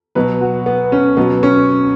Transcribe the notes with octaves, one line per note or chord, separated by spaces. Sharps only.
B2 F#3 B4
F#4
B3
C#4
B2 F#3 B3
C#4